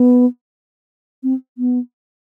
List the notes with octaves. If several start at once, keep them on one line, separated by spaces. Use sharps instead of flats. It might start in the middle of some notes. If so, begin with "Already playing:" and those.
Already playing: B3
C4
B3